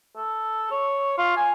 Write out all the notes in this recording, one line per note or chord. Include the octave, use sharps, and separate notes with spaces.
A4
C#5
F4
G#5